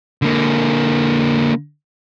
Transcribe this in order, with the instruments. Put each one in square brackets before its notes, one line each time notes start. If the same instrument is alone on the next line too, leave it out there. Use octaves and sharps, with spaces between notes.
[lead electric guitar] D3 A#3